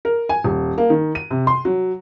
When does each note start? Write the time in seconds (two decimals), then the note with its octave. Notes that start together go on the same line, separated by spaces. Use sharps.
0.05 A#4
0.29 G#5
0.44 D#1
0.78 A#3
0.90 D#3
1.15 D#7
1.31 C3
1.47 C6
1.65 F#3